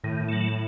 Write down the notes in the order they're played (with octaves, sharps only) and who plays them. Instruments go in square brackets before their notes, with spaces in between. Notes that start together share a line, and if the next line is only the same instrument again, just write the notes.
[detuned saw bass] A2 [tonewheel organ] D#3
[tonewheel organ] F#3 A3